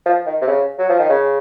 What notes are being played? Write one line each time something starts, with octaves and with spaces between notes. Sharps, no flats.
F3
D#3
C3
C#3
F#3
F3
D#3
C#3